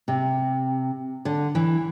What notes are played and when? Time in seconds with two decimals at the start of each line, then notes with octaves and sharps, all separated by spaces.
0.08 C3
1.25 D3
1.55 E3